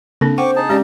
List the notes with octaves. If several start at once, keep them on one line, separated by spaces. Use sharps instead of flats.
C#3 A#3 C4 D4 A4
C5 F#5 G5 C#6 D6
D#4 G#4 A5
G#3 C#4 G4 D5